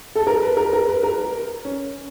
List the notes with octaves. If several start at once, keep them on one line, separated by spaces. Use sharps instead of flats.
A4
A#4
B4
A#4
A#4
B4
A#4
A#4
C#4